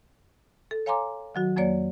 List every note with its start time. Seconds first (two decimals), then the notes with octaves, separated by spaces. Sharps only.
0.71 A4
0.86 C#5 F5 G#5 A#5 C6 D6
1.35 D#3 F#3 F#4
1.56 F2 F#3 A#3 C#5 D5